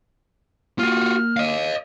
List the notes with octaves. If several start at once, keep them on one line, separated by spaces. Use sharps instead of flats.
A#3 F4 F#4 F6
D#5 F5